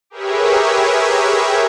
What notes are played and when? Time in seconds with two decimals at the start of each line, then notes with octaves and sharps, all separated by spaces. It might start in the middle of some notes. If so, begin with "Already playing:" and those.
0.10 G4 G#4 A#4 B4 C#5 E5